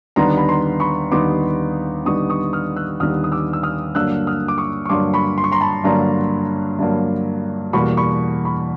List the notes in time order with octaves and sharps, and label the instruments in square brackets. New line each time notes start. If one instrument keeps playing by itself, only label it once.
[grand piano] D#2 D3 G3 B3 D#4 A#5 C6
B5
A#5 C6
B5 C#6
D#2 D3 G3 B3 D#4 C6 D6
D#2 D3 G3 B3 D#4 C#6 D#6
C#6 D#6
D#6 F6
E6 F#6
D#2 D3 G3 B3 D#4 D#6 F6
D#6
D6 E6
E6
D#6 F6
G2 D3 F#3 A#3 E6 F#6
D#6 F6
D6
C#6 D#6
C#6
G2 D3 F#3 A#3 C6 D6
B5 C#6
C6
C#6
A#5 C6
A5 B5
G2 D3 F#3 A#3 A#5 C6
G2 D3 F#3 A#3
E2 B2 G3 A#3 B5 C#6
B5 C#6
B5 C#6